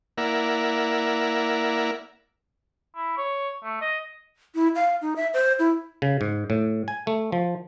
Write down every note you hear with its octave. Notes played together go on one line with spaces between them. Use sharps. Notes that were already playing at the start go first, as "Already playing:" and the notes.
A#3 E4 A#4 D5 E5 F#5
E4
C#5
A3
D#5
E4
F5
D#4
E5
C5
E4
C#3
G#2
A2
G#5
A3
F3